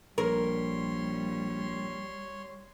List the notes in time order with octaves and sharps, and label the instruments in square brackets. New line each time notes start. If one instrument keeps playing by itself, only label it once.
[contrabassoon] A#1 [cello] G3 [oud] A#4 [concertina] C#5 C6